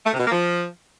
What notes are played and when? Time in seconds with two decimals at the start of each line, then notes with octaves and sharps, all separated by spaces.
0.05 A3
0.12 C3
0.19 B2
0.25 A#3
0.32 F3